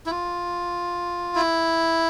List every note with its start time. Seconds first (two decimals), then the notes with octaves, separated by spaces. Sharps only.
0.06 E4
0.11 F4
1.35 E4